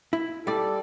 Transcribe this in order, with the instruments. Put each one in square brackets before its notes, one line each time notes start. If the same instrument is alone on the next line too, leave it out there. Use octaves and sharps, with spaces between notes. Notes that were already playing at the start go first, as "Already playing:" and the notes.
[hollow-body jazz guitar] E4
[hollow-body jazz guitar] G3 D5 [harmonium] A4